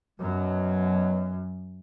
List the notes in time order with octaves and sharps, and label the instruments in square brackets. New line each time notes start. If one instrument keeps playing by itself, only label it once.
[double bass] F#2 [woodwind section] B2 F#3